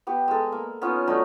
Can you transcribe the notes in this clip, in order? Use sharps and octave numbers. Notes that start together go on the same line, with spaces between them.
B3 G4
G#3 A4
A#3
B3 C#4 D#4 F4
F#3 A3 D4 D#4